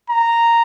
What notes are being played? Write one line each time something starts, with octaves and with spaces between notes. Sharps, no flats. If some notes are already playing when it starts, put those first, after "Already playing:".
A#5